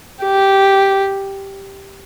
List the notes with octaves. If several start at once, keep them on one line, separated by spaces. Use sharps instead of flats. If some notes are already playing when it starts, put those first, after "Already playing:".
G4